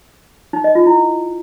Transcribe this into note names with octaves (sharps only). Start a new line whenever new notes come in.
D#4
D#5
F4
E4